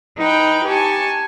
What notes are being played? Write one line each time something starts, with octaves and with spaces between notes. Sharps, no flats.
D#4 B4 G5
G4 G#5 A5 C#6